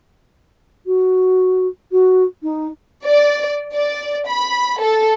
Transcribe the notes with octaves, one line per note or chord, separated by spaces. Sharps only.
F#4
F#4
D#4
D5
D5
B5
A4